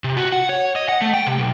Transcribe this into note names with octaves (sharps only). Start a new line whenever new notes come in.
C3
F#4
F#5
C#5
D#5
F#5
A3
G5
C3
B1